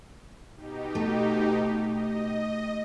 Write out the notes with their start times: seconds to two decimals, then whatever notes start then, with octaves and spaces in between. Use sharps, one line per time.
0.55 B2 D#4 G4
0.95 A3
1.84 D#5